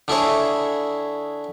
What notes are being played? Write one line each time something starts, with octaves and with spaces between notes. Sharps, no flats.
D3 E4 G#4 C#5